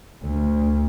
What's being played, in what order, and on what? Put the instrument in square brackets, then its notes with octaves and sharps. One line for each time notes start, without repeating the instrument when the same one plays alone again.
[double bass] D2